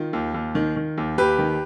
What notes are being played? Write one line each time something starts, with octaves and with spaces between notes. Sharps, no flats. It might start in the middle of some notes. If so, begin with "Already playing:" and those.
Already playing: D#3 F4
D#2
D#2
D#3
D#3
D#2
D#2 G4 B4
D#3